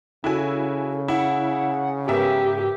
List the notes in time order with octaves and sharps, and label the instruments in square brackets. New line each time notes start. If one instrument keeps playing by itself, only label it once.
[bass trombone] C#3 [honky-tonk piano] E4 F#4 G#5 [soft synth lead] A4
[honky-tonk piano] E4 [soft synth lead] F#5
[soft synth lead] G#2 [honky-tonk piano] B3 A#4 E5 [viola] G4